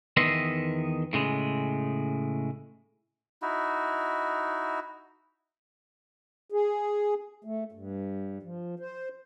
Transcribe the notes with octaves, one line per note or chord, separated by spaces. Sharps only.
E2 D#3 B3 D#5 E5 C6
A2 C#3 G#3
D#4 E4 F#4
G#4
A3
G2
F3
C5